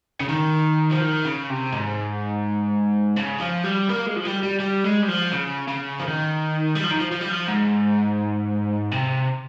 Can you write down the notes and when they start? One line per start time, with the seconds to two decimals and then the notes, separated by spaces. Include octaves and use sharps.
0.20 C#3
0.29 D#3
0.91 F3
1.01 D#3
1.25 C#3
1.50 C3
1.73 G#2
3.17 C#3
3.41 F3
3.64 G3
3.89 A#3
4.07 G#3
4.16 F3
4.25 G3
4.43 G3
4.60 G3
4.84 G#3
5.02 G3
5.08 F3
5.33 C#3
5.68 C#3
5.99 F3
6.04 D#3
6.76 G3
6.84 F3
6.91 D#3
7.00 F3
7.12 F3
7.21 G3
7.30 F3
7.48 G#2
8.92 C3